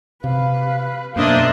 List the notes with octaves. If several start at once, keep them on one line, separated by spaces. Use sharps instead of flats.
C3 B4 F5
F#2 B2 A#3 D4 C5 D#5 E5